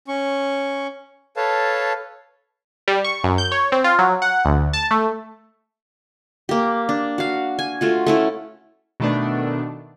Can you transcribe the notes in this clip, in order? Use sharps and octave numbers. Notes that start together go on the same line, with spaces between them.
C#4 C#6
A4 B4 C#5 F5 A5
G3
C#6
F#2
G6
C#5
C4
F4
F#3
F#5
D2
A5
A3
A#3 G4
D4
F#4 F5
G#5
A3 F4 F#4
A3 C#4 E4
B2 D#3 A3 B3 D4